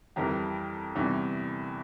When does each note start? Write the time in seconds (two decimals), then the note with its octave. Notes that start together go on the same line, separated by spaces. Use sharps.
0.16 F2 E3 G3 G4 A#4
0.95 E2 C3 E3 G3